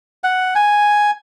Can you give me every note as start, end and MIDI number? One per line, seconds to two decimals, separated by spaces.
0.24 0.54 78
0.55 1.11 80